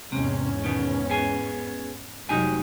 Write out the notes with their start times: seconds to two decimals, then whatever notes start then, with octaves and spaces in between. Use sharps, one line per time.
0.12 E2 G#2 C3 C#4
0.64 B2 D#3 B3
1.10 B3 G#4 G#5
2.29 F1 F#3 G#3 D#4 G4 G#5